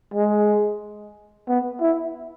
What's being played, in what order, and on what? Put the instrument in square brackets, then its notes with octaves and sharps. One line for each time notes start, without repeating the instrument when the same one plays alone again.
[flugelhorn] G#3
B3
E4